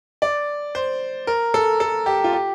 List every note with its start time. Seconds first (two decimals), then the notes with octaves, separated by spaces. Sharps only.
0.22 D5
0.75 C5
1.27 A#4
1.54 A4
1.80 A4
2.06 G4
2.24 F4
2.33 G4